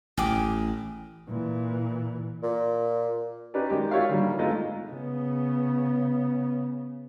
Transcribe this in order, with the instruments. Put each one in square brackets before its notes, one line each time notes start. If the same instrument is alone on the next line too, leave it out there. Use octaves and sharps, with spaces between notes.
[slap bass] A1 [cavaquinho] G#4 G5 D6
[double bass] A#2 E3
[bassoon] A#2
[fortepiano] C#4 D#4 G4 B4 D5
D#3 G#3 G4
F4 G4 C#5 D5 E5 F5
D3 D#3 F#3 G3 A#3
G#3 A3 B3 D#4 F4
[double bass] C#3 B3